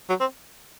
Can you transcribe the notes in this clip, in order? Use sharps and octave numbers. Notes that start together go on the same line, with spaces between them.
F#3
C4